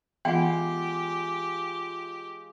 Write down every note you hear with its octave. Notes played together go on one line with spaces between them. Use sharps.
E3 G#3 B3 F4 G4 F#5 G5